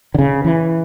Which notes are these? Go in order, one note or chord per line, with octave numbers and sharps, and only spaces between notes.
D3
C#3
E3